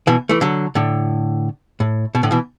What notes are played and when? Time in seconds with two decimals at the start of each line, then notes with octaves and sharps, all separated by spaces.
0.07 B2 E3
0.29 E3 A3
0.41 D3 F#3
0.75 A2 D3
1.80 A2
2.15 B2
2.23 A2 D3
2.31 B2 E3